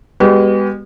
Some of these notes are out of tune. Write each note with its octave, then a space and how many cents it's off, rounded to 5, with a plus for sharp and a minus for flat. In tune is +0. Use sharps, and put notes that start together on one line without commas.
G#3 -40 B3 +0 G4 -45